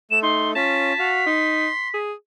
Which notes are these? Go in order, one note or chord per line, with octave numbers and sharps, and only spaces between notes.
A3 E7
D#4 C6
C#4 F4 A5 B6
F#4 F5
D#4 C6
G#4